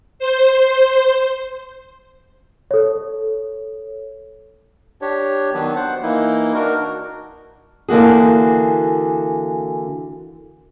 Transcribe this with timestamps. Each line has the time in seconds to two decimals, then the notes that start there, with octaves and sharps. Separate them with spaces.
0.19 C5
2.71 A4 C#5
5.02 D4 G4 C#5
5.54 D#3 F#3 B3 D4
5.76 C5 F#5
6.02 E3 A#3 D#4 E4
6.54 D4 D#4 F#4 A#4
7.89 D3 E3 A#3 F#4 G#4